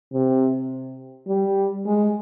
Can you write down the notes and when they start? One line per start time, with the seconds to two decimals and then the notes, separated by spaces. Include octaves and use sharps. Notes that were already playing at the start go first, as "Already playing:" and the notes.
0.13 C3
1.28 G3
1.86 G#3